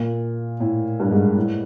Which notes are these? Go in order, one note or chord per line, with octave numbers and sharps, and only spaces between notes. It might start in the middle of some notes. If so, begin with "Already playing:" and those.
Already playing: A#2
A2
G2
G#2
A2